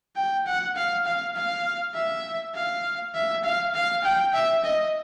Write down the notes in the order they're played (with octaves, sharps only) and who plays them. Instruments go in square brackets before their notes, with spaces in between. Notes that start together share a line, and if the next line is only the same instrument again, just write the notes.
[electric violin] G5
F#5
F5
F5
F5
E5
F5
E5
F5
F5
G5
E5
D#5